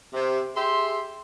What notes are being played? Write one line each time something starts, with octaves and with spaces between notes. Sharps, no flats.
C3
G4 G#4 E5 C6